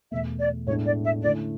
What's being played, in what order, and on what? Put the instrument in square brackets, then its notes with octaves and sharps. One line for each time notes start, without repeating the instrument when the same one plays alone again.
[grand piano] E2 B2 A3 [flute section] E5
[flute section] D5
[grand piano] A2 G#3 B3 D4 [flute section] C#5
[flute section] D5
E5
[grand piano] D3 A3 C#4 E4 [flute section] D5